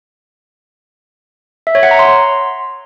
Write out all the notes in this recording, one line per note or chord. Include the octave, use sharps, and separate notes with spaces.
E5
C#5
F#5
A#5
C6